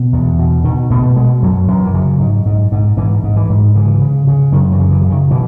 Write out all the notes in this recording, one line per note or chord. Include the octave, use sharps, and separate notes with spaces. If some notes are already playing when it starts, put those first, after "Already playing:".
Already playing: B2
E2
B2
B2 D#3
B2 A3
B2 G#3
F#2 F#3
F#2 E3
E3
C#3 F#3
G#2
G#2
G#2
G#2 E3
G#2
E3
G#2
C#3 E3
C#3
C#3
F#2 D#3
E3
C#3
E3
C#3
D#3
B2 E3